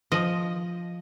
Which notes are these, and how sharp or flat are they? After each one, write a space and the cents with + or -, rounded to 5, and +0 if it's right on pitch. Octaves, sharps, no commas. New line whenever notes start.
F3 +0 D#5 +0